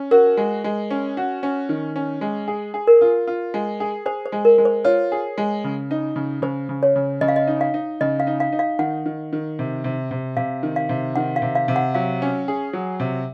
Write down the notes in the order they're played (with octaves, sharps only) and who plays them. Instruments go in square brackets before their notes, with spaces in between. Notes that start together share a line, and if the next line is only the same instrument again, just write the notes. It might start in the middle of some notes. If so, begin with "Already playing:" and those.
Already playing: [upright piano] C#4
[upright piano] F#4 [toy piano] A#4
[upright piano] G#3
G#3
C#4
F#4
C#4
D#3
C#4
G#3
G#4
G#4
[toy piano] A#4
[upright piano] F4
F4
G#3
G#4
[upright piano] G#4 [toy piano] C5
[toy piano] C5
[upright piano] G#3
[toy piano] A#4
[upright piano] G#3
[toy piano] C5
[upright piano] F4 [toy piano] C#5
[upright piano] G#4
G#3
C#3
D#4
C#3
[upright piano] C#3 [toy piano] C5
[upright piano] C#3
[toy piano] C#5
[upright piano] C#3
[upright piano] C#3 [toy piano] D#5
[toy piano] F5
D#5
[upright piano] D#4
[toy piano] F5
[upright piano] D#4
[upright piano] C#3 [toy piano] D#5
[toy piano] F5
[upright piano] D#4
[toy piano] F5
[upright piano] D#4
[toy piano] F5
[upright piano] D#3 [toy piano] F#5
[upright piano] D#3
D#3
C3
C3
C3
[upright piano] C3 [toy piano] F5
[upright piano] D#3
[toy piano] F5
[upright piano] C3
[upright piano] D#3 [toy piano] F#5
[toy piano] F5
[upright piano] C3
[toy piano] F5
[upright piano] C3
[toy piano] F#5
[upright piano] F#3 [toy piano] F5
[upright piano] C#4
G#4
F#3
C3